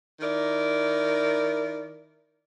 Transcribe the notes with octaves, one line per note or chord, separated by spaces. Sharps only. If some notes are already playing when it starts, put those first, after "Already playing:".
D#3 E4 A#4 D5